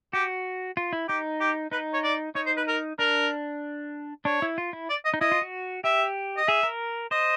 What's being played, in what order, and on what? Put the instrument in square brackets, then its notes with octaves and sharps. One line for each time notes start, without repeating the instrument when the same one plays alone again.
[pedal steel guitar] F#4 [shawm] G4
[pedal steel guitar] F4
E4
[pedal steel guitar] D#4 [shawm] G4
[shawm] G4
[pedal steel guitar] D#4 [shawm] B4
[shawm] C#5
D5
[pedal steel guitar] D#4 [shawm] C#5
[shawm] C5
B4
A#4
[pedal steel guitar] D4 [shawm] A#4
[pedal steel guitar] D4 [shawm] C#5
[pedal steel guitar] E4
F4
E4
[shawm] D5
D#5
[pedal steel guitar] D#4
[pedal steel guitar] E4 [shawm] D#5
[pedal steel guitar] F4
F#4
[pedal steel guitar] G4 [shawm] E5
[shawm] D#5
[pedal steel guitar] G#4 [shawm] E5
[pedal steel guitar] A#4
[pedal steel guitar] C5 [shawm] D#5